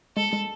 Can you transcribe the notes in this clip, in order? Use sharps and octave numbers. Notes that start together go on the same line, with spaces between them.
G#3 A4
G#3